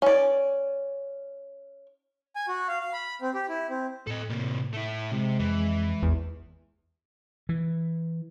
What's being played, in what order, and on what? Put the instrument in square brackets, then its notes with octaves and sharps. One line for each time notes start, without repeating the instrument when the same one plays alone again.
[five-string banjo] C#4 D5
[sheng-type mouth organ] G#5
F#4
F5
F5
B5
C4
G4
E4
C4
[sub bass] A2 [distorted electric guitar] A4 D#5
[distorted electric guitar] C3 A#3
A3 E4
[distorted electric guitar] C3 [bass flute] G#3
[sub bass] F2 [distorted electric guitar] E3
[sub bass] A1 [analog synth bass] E2
[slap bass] E3